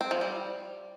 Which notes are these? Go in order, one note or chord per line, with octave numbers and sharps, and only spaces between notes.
C4
F3
G3